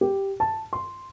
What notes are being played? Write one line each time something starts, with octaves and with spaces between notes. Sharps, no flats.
G4
A5
C6